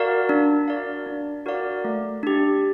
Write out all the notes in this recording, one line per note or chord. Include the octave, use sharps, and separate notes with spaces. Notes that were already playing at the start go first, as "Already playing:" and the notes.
Already playing: F#4 A#4 D5 F5
D4
F#4 A#4 D5 F5
D4
F#4 A#4 D5 F5
A3
D4 G4